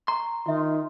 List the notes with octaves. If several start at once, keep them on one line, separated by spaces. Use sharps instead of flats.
A#5 C6 C#6
D#3 F4 E5